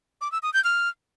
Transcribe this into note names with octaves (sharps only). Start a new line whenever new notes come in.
D6
E6
D#6
G6
F6